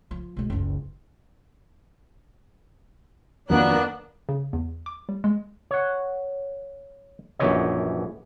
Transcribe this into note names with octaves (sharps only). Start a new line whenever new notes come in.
F3
B2 G#3
F#1 C#2
F2 D#3 F#3 A#3 B3 D4 A#4 F#6
C#3
E2
D6
G3
G#3
C#5 F#5
A#1 F#2 E3 G4 C#5 D#5